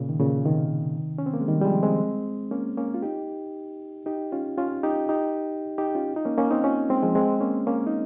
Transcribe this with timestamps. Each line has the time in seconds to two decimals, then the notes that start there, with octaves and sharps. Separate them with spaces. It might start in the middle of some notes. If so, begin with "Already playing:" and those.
Already playing: A#2 C#3
0.09 D#3
0.19 A#2 C#3
0.45 C3 D#3
1.18 C#4
1.26 C4
1.34 A#3
1.41 G#3
1.48 D#3 G3
1.61 G3
1.65 F3 G#3
1.83 G#3 C4
2.51 A#3 C#4
2.77 A#3 C#4
2.94 F4
3.02 D#4 G4
4.06 D#4 G4
4.32 C#4 F4
4.58 C#4 F4
4.83 D#4 G4
5.09 D#4 G4
5.78 D#4 G4
5.95 C#4 F4
6.16 D#4
6.25 A#3 C#4
6.38 A#3 C#4
6.51 C4 D#4
6.64 C#4 F4
6.90 G#3 C4
7.03 F3 G#3
7.15 G#3 C4
7.41 A#3 C#4
7.67 A#3 C#4
7.87 D#4